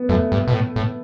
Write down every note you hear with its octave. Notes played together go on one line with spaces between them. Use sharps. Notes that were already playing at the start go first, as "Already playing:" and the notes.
Already playing: B3
F#2 A3
G2
B2
A2
A2